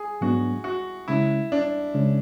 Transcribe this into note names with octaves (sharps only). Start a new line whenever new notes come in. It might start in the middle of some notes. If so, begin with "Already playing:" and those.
Already playing: G#4
G#2 F#3 B3 D4 F#4
F#4
C#3 G#3 C#4 E4
D4
C#3 G#3 C#4